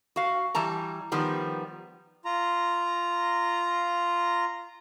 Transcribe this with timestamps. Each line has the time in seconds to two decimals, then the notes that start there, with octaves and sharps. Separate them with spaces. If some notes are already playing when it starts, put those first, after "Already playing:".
0.16 F#4 F5
0.55 E3 G3 A5 A#5
1.12 D#3 F3 G3 B3
2.25 F4 A#5